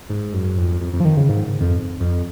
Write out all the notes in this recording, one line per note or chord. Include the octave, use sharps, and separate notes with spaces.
G#2
F#2
F2
F2
F2
F3
D#3
C#3
G#2
F2
F2